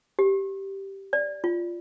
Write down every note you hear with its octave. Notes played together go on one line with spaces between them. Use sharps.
G4
D5
F4